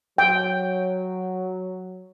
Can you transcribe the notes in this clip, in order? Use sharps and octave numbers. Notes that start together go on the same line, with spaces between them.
F#3 G5